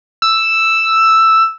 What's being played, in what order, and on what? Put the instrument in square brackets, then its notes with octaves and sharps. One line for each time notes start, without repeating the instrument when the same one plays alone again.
[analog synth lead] E6